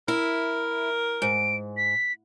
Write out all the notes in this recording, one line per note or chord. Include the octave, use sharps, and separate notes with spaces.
E4 A#4
G#2 D7
B6